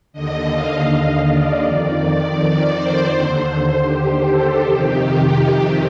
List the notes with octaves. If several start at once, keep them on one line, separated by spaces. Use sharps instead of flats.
D#2 D3 D#5
F5
D#5
D5
F2 D#3 D5
D5
C5
D#2 D3
G4
A4
F2 C3 D#3 G4